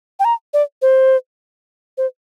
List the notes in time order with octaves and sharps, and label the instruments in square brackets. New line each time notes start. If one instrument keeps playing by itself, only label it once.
[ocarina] G5
A#5
D5
C5
C5